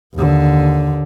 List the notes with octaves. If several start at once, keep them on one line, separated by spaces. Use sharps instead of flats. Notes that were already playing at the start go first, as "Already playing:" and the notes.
D#2 D3